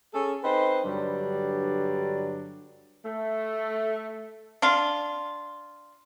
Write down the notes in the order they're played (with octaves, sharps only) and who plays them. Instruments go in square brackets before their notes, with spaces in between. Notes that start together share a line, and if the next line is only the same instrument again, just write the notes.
[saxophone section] C#4 G#4 A4
C4 D#4 B4 C5 D#5
G2 D3 F#3 G3 D4
A3
[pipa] D4 F4